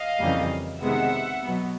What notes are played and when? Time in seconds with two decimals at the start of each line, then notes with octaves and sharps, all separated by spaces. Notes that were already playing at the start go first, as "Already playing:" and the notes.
Already playing: D#5 F5
0.20 F2 C#3 E3 G3 A#3
0.82 C3 D#3 G#3 B3 E5 F#5
1.44 B2 F#3 B3